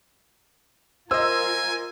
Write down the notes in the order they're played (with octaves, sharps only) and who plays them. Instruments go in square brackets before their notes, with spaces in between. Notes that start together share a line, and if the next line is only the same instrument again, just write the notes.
[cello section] F4 A#4 [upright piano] C5 D#5 [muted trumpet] G#5 [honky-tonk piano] E6